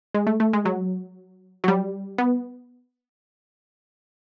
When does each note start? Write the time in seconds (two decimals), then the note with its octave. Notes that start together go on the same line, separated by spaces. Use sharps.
0.14 G#3
0.27 A3
0.40 A3
0.53 G#3
0.65 F#3
1.64 F#3
1.68 G3
2.18 B3